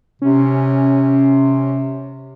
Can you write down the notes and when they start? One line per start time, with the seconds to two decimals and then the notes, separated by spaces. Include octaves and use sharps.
0.22 C3 C#4